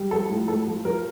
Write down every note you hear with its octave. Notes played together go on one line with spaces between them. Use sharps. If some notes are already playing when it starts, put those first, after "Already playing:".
Already playing: G3
F3 A4
A2
A2 A4
F3
F3 A#4